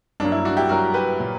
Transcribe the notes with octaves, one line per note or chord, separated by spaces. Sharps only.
G2 F#3 A#3 D4
E4
D4 F#4
E4 G4
G2 F#3 A#3 F#4 A#4
G4 B4
A#2 F#3 A#3